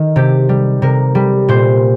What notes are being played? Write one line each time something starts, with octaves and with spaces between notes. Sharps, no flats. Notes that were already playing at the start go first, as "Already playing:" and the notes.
Already playing: D#3
C3 G4
G3
C3 A#4
G3
A#2 C5